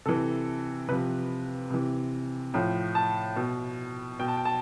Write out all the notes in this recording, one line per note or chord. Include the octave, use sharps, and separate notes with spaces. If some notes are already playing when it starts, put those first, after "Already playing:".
C3 E3 A4
C3 F3 B4
C3 E3
A2 F3
A5
B2
B2 G5
A5
G5
A5